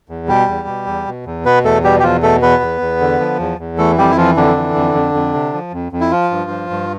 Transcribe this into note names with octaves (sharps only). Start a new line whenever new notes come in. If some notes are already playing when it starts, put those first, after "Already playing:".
E2
B2 G3 G4
E2
B2
E2
B2
E2
B2 B3 B4
E2 A3 A4
B2 G3 G4
G4
E2 F3 F4
B2 A3 A4
E2 B3 B4
E2
E2
D3
F3
E2
E2
E3 A3 A4
F2 G3 G4
E4
E3 F3 F4
F2 D3 D4
E3
F2
F2
F2
C3
F3
F2
F2
E4
F3 F4
G2
F3
G2